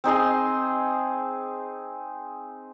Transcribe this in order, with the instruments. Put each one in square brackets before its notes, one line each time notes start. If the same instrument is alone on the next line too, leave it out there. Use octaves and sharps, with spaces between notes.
[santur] C4 D#4 G#4 C6